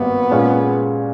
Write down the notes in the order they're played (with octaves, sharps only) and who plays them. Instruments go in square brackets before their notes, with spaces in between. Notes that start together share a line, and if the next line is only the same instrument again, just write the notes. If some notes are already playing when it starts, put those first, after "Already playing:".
Already playing: [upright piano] G#1 G2 G3 A#3 [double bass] B3
[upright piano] A#2 G#3 C#4 G#4